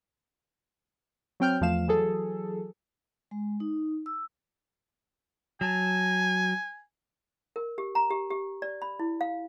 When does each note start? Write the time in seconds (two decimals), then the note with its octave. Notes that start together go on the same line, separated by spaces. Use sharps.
1.40 F#3 C4 G5 F6 G6
1.61 E2 F3 A3 F5 E7
1.87 E3 F#3 G#4 A4
3.31 G#3
3.60 D#4
4.06 E6
5.61 F#3 G#5 A5
7.56 A#4
7.78 G4
7.95 A#5
8.11 G4
8.30 G4
8.62 D5
8.82 B5
8.99 E4
9.21 F5